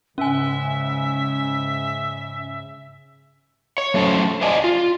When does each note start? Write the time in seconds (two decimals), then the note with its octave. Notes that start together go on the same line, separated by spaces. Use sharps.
0.18 G#2 C#3 C#4 E5 G#5
3.78 C#5
3.94 F#3 A3 C#4 A4 C5
4.41 C5 D5 D#5 G#5 A5
4.64 F4